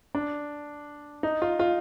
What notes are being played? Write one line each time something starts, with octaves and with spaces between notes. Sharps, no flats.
D4
D#4
F4
F4